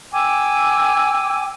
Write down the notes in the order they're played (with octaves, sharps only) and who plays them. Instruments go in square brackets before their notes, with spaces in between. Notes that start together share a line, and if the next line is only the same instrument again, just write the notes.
[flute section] G5 G#5 D6 E6